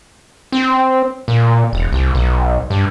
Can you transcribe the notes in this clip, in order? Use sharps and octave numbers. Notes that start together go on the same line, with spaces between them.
C4
A#2
E1
C2
B1
G2